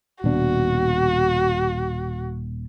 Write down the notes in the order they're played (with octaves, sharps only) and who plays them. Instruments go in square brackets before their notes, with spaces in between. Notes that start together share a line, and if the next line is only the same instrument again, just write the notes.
[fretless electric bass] D#1 B2 D4 [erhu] F#4